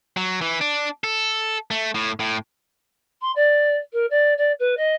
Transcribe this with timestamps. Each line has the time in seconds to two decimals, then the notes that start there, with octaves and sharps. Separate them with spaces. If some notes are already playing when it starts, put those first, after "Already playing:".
0.16 F#3
0.41 E3
0.61 D4
1.04 A4
1.71 A3
1.95 A2
2.20 A2
3.21 C6
3.35 D5
3.92 A#4
4.10 D5
4.37 D5
4.59 B4
4.77 D#5